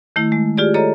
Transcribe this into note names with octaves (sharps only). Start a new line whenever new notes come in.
D#3 A3 E4
G#3
F4 G4 G#4 D5
A4 C#5 D#5 A#5